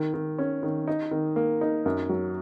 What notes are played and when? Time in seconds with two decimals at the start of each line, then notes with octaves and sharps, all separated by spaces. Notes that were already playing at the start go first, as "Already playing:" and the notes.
Already playing: D#3
0.14 D#3
0.38 C#4
0.63 D#3
0.87 D#4
1.11 D#3
1.36 A#3
1.61 D#4
1.86 F#2
2.09 F#3